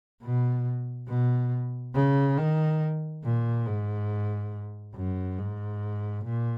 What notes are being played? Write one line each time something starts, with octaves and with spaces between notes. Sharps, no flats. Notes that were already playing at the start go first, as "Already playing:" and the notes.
B2
B2
C#3
D#3
A#2
G#2
F#2
G#2
A#2